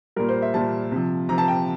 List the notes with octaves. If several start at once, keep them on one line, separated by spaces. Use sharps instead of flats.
A#2 G3 A#4
C5
E5
A#2 G3 A5
C3 F3
C3 F3 A#5
A5
G5